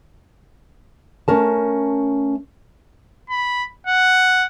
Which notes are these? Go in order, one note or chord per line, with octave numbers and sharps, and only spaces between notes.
A3 C#4 A#4 A5
B5
F#5